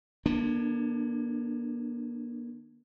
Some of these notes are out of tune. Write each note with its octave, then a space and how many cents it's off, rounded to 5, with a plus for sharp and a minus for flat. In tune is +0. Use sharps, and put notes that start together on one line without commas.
D3 +35 A#3 +40 D4 +0